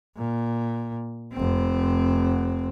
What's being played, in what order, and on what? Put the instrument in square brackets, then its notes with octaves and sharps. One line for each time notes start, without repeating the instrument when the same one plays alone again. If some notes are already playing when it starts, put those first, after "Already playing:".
[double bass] A#2
F1 C4